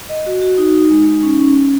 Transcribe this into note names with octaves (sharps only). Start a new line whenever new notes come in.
D#5
F#4
F#4
D#4
D#4
G#3
D#4
C#4
C#4
C#4